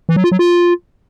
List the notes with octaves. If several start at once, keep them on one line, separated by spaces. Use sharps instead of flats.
E3
F#3
F4
F#3
F4